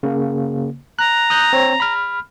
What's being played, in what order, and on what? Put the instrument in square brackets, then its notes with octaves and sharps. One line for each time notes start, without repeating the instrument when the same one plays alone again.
[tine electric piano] C#3 A#3
[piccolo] A#5 [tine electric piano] F#6
[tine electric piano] D#6 F#6 G6
C4 C5 C#5
B5 F6